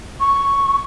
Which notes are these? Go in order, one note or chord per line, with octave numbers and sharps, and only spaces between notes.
C#6